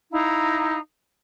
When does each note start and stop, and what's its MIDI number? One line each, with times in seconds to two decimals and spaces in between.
0.12 0.79 63
0.12 0.79 64
0.12 0.79 77
0.12 0.79 82